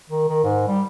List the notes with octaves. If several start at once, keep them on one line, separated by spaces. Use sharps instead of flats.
D#3
D#3
G#2
G3